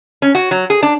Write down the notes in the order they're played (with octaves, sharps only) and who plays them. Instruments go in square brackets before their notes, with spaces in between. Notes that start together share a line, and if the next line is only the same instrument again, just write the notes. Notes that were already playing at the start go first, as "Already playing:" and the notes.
[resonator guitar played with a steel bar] C#4
F#4
F#3
G#4
D4